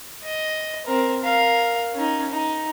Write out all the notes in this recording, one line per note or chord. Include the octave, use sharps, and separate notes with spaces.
D#5
C4 A#4
A#4 F5
C#4 D#4
D#4